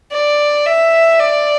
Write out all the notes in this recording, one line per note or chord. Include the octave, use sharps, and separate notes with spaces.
D5
E5
D5